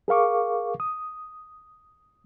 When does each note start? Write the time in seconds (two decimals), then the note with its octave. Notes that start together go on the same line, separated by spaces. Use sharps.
0.08 G#4 A#4 F5 C#6 D6
0.80 D#6